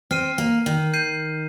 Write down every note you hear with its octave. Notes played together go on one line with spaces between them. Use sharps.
C4 F6 C7 D#7
A#3
D#3
G6 C7 D#7